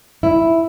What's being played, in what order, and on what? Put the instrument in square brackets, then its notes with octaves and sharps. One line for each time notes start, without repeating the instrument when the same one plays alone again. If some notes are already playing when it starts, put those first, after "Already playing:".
[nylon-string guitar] E4